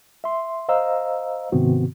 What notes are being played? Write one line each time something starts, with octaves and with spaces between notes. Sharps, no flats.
E5 C6
C5 D#5 F5 A#5 E6
G#2 C3 D#3 B3 C4 F#4